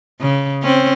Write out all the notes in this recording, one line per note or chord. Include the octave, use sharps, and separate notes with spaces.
C#3
C4 C#4